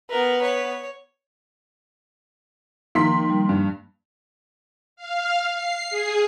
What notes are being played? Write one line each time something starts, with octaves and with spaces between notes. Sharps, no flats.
B3 A#4 B4
C#5
D#3 F3 A#3 C6 B6
G3
G2
F5
C7
G#4